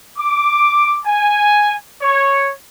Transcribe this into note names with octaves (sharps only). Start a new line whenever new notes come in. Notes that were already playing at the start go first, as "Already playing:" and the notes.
D6
G#5
C#5